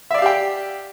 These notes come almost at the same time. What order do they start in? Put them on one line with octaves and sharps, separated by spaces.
E5 D5 F5 G4 G5